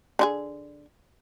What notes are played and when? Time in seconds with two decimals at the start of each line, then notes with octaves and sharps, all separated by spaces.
0.19 D3 D#4 G#4